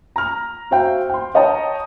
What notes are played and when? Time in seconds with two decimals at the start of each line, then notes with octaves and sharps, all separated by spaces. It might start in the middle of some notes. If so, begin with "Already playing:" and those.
0.16 A#5 F6
0.71 F#4 C5 E5 F5 G5
1.09 G5 C6
1.34 C#5 D#5 G5 A5 A#5